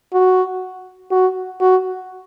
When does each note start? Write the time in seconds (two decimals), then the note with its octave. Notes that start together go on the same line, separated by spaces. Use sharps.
0.13 F#4
1.11 F#4
1.61 F#4